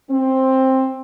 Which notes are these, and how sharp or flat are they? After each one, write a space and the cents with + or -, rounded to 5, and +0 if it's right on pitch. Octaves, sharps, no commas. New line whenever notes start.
C4 +10